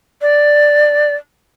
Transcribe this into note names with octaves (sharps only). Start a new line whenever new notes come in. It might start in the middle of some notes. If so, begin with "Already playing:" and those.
D5